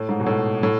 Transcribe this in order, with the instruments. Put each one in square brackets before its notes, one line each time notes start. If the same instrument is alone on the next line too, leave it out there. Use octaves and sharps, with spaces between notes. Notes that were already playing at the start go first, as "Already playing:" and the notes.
Already playing: [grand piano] A2
G#2
B2
A2
A2